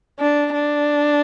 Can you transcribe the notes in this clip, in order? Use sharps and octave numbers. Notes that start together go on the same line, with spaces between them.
D4
D4